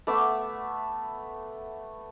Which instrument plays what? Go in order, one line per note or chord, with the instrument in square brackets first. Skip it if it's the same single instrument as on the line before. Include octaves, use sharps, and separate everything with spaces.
[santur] A3 B3 E5 D6